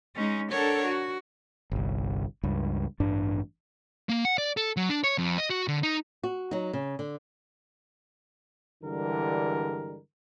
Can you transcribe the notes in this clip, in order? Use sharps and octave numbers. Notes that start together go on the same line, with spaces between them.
G#3 C#4 D#4
D4 A4 A#4 C#5 F#5
F#4
G1 C2
C#2 G2
A1 G2 D4
A#3
F#5
D5
A4
F#3
D4
C#5
F2
D#5
F#4
D3
D#4
F#4
F#3 D#4
C#3
D3
G2 D3 E3 G3 G#3 A#4